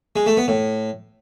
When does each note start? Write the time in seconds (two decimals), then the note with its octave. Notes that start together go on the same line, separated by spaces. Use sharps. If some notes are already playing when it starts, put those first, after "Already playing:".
0.16 G#3
0.26 A3
0.37 B3
0.48 A2